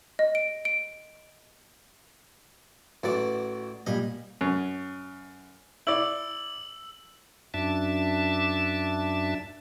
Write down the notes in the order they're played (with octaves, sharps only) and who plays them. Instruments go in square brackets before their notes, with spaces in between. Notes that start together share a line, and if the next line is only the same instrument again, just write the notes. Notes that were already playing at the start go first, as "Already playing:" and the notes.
[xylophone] D#5
D7
D7
[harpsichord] A1 E3 D5 [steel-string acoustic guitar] F#4
[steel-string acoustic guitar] A#2 G3 [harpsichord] D#5
[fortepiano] F#2
[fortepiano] E4 D5 [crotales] E6 F#7
[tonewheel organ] F#2 D4 E5 A5